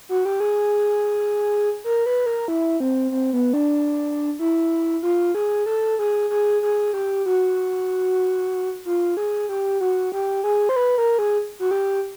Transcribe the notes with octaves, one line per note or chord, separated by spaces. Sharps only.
F#4
G4
G#4
A#4
B4
A#4
E4
C4
C4
B3
D4
E4
F4
G#4
A4
G#4
G#4
G#4
G4
F#4
F4
G#4
G4
F#4
G4
G#4
C5
B4
A#4
G#4
F#4
G4